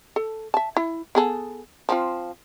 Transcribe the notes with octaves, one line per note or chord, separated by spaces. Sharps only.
A4
E5 A5
E4
B3 G#4 A4
F3 C4 F4